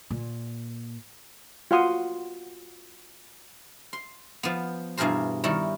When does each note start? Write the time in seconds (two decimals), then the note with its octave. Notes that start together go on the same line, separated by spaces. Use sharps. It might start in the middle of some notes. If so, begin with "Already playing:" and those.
0.10 A#2
1.71 F4 F#4 F5 F#5 C6 D#6
3.93 C6
4.43 F3 B3
4.97 G2 B2 E3 G#4 A#4 C5
5.44 D#3 G3 E4 A#4 C#5